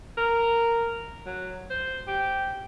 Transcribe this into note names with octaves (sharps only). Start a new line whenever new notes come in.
A#4
F#3
C5
G4